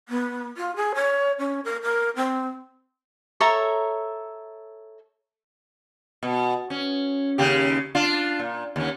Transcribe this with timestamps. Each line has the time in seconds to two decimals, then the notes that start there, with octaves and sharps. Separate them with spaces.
0.08 B3
0.57 F4
0.76 G#4
0.95 C#5
1.38 C#4
1.64 A#4
1.82 A#4
2.16 C4
3.40 A4 C#5 E5 A#5
6.23 B2
6.70 C#4
7.38 D#2 C#3 G4
7.95 D4 F4
8.39 A#2
8.76 D#2 C#4